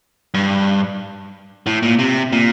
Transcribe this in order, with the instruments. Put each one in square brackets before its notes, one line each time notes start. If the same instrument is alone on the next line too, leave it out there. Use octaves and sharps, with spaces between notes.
[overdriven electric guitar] G2
A2
A#2
C3
A#2